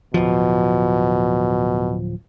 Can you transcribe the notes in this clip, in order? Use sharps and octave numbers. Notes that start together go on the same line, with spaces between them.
D1 B2 F3